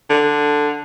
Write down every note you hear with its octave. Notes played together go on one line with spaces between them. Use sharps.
D3